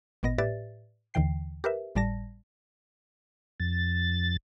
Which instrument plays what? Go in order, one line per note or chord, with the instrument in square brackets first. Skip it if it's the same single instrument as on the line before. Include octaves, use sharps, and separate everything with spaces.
[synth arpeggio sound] G#1 A#2 B3 D#5 A#6
A2 G4 B4 D5 E5 A6
D#2 D3 E3 G5 C7
G4 A#4 B4 E5
G#1 A2 G3 D5 A5 A#6
[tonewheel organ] F2 A6